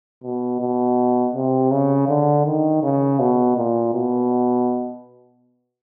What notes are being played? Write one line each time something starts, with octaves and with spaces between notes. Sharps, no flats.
B2
B2
C3
C#3
D3
D#3
C#3
B2
A#2
B2